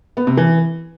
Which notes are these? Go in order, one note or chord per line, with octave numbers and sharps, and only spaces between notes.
B3
C3
E3